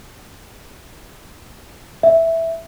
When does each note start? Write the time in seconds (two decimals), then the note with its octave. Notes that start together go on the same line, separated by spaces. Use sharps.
2.03 E5